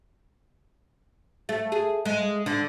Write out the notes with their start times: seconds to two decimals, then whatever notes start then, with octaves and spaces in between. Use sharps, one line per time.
1.49 A3
1.72 G#4
2.05 G#3
2.46 D3